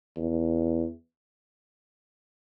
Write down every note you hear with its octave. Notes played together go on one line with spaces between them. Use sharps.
E2